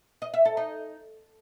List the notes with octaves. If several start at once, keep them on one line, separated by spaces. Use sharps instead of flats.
D#5
E5
A4
D#4